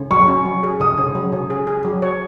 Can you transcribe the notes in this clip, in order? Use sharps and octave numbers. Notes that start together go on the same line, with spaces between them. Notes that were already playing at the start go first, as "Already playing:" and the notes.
Already playing: C#3
F#3 C#6
C#4
F#3
G#4
C#3 D#6
C#3
F#3
C#3
G#4
G#4
F#3
C#5